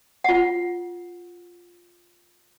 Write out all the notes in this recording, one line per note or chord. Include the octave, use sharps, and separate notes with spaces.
F4 F#5